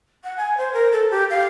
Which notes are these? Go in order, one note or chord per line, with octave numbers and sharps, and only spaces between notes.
F#5
G#5
C5
A#4
A4
G4
F5